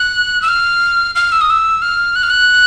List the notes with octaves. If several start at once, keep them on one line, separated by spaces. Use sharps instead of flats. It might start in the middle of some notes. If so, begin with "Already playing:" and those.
Already playing: F#6
E6
F6
F6
E6
D#6
E6
F6
F#6
F6
F#6